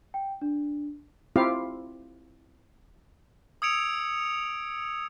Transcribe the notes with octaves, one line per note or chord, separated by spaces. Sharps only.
G5
D4
C4 E4 F4 G4 F5
D#6 E6 G#6 C#7 D7 F7